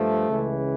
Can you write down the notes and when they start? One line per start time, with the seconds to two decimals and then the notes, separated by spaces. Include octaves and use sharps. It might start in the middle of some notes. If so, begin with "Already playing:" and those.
Already playing: G2 F3 A3
0.30 C#2 C#3 E3